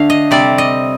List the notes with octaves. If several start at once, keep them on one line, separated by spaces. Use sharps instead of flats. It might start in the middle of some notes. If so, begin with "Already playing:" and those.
Already playing: D3 A3 D4 F5
D#5
C3 G3 C4 D5
D#5